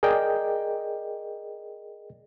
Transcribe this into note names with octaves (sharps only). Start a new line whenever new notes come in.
G#4 A#4 D5 D#5 G5